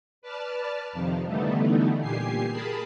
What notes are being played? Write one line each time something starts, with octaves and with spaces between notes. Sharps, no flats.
B4 D5 A5 F6
F2 C3 D#3 F3
D3 E3 G3 A3 B3 D#4
A#2 G4 G#5 C7
G#4 A#4 A5 B5